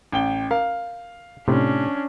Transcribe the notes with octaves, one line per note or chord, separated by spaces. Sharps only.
A1 G5 G7
A#4 F5
A2 C3 C#4 D4